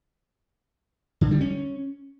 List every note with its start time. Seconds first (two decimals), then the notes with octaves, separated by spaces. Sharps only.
1.21 D3
1.31 G3
1.41 C#4